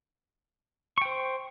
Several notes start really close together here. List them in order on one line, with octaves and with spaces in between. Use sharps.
C#6 G5 C5